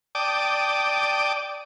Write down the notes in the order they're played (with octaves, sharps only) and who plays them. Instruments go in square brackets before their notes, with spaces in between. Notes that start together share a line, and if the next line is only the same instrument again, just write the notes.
[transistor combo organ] D5 G5 A5 D6 D#6